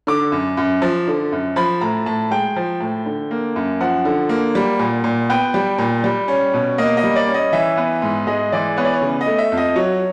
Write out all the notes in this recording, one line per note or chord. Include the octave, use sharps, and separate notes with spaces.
D3 D6
F#2
F#2
F3
D3
F#2
F3 B5
A2 A#5
A2 A5
G#3 G5
F3
A2
D3
A#3
F#2
F3 F#5
D3
A#3
G3
A#2
A#2
B3 G5
G3
A#2
G3
C#4
B2
A#3 D#5
D#5
G3
D5
C#4
D#5
E3 E5
B3
G#2
G#3 D#5
E3 D5
B3 C#5
D5
C#5
C#3
D#5
A3
E5
F2
D#5
F#3 C#5